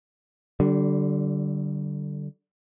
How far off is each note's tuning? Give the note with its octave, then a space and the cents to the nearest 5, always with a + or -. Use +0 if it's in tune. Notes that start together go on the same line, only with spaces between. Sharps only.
D3 +0 G3 -35